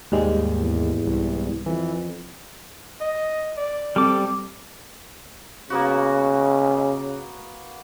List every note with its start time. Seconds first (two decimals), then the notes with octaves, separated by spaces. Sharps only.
0.12 D#2 G#2 G3 G#3
0.60 E2
1.07 C2
1.66 F2 E3
3.01 D#5
3.57 D5
3.96 G3 C4 A4 D6
5.70 C#3 A#3 B3 F#4